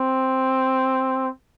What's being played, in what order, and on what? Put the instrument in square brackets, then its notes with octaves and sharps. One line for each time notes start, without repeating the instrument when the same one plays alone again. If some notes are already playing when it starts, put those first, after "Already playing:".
Already playing: [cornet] C4